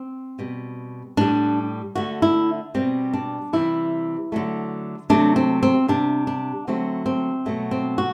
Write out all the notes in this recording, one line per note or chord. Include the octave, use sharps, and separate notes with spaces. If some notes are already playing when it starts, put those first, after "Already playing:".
Already playing: C4
B2 G3
A2 G3 D4
D3 A3 F#4
E4
B2 G3 C4
D4
C3 E3 G3 E4
D3 F#3 A3
C3 F#3 A3 D4
C4
C4
C3 G3 D4
D4
D3 F#3 A3 C4
C4
B2 F#3 A3
C4
F#4